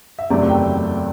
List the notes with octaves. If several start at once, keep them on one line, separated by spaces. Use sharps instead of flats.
E5
F#1 E2 C3 F#3 A3 D5
G5